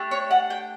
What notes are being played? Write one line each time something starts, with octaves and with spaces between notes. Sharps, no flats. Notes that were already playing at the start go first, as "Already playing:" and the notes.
Already playing: A3 D4 G4
C#5
F#5
G5